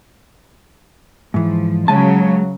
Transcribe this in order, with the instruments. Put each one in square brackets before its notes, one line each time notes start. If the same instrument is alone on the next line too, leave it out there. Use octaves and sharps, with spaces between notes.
[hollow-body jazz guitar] G#2 E3 [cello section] F3
[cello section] C#3 F#3 [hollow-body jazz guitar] G#3 G#5 A5